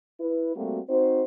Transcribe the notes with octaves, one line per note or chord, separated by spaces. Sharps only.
E4 B4
G3 A3 A#3 C4 F#4
C4 D#4 F#4 C5